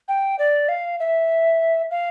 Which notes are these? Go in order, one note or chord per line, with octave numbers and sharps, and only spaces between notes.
G5
D5
F5
E5
F5